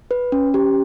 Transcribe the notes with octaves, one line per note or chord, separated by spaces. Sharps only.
B4
C#4
G4